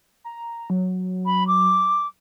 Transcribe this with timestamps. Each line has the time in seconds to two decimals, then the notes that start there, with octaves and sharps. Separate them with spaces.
0.24 A#5
0.70 F#3
1.26 B5
1.47 D6